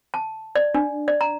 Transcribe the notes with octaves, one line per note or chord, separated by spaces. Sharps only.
A5
D5
D4
D5
A#5